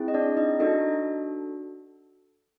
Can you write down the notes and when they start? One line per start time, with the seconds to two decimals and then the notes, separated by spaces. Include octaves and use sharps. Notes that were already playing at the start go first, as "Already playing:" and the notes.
Already playing: C4 E4 G#4
0.08 D#5
0.14 D4 D5
0.37 D#4 D#5
0.60 D4 D#4 F#4 A4 D#5